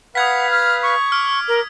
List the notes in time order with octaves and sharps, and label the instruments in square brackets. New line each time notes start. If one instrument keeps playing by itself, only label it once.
[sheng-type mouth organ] B4 F5 [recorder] F#5 [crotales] D#6 G#6 B6
[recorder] F6
C#6
[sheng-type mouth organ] D6 [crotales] F6
[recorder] A#4